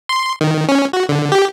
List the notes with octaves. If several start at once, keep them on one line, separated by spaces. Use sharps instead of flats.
C6
D#3
C#4
F#4
D3
G4